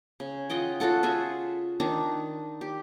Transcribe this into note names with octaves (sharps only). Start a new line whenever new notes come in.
C#3
F4 D#5 F#5 G5
F4 F#4 A4 F#5
F4 F#4 G#4 E5
D#3 D4 D#4
G4